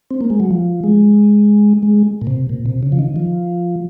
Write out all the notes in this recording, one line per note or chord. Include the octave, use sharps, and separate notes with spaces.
C4
A#3
G#3
F#3
F3
G#3
G#3
A#2
C3
A#2
C3
C#3
F3
D#3
F3